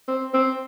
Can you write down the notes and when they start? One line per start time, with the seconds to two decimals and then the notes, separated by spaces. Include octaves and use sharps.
0.08 C4
0.34 C4